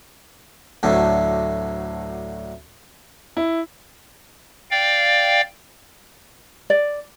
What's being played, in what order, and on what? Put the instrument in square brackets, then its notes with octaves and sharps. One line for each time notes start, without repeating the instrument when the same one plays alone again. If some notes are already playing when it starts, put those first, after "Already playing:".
[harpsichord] D2 A2 D3 F#3 A3
[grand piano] E4
[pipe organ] D5 F5 G5
[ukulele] D5